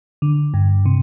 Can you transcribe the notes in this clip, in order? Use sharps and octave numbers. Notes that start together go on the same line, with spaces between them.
D3
G2
C3